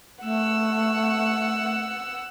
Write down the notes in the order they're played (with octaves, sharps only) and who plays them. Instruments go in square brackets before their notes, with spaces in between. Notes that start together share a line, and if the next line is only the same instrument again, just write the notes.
[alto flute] A3 [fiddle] F#5 E6